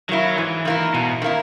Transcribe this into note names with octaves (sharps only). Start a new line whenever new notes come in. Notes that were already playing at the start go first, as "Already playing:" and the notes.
D#3 F#3 A#3 E4
G#2 E3
D#3 A#3 E4
G#2 B2
D#3 A#3 E4